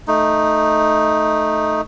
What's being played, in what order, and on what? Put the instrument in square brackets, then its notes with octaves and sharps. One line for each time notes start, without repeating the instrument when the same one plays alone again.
[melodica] A3 D#4